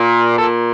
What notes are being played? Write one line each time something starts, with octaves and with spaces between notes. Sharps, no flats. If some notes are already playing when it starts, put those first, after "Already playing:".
Already playing: A#2
A#2 A4